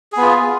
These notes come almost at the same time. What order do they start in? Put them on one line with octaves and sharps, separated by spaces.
G#4 B3 F4